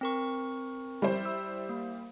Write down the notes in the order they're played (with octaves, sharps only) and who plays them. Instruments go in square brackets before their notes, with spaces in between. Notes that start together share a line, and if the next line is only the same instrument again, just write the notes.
[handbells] C4 A#4 C#6
[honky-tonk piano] G3 E4 C5
[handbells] E6
A#3